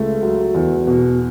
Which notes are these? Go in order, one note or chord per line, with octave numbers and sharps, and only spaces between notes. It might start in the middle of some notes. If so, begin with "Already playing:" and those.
Already playing: C#2 A3
F#3
E2
B2